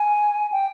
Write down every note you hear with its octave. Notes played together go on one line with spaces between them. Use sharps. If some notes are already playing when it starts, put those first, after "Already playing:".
Already playing: G#5
G5